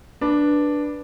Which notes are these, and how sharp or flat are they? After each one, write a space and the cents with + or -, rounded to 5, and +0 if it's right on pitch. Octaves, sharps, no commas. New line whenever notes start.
D4 +0 B4 -15